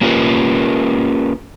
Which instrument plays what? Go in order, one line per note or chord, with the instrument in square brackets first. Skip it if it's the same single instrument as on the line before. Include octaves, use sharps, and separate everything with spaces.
[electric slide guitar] A#3 C#4 F4 G4 A#4 B4